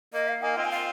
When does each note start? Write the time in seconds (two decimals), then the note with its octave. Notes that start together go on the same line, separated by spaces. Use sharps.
0.14 A#3 D#5
0.28 F5
0.42 A#3 D#4 G#5
0.56 C4 F4 D#5
0.65 G#5
0.71 F5